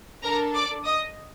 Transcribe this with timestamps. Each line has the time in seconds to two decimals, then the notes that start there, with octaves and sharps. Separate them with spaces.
0.24 D4 A4 A#4 A#5
0.55 D5 D6
0.84 D#5 D#6